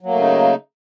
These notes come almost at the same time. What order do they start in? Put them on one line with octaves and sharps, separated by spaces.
F#3 A#3 A3 C#3 D#4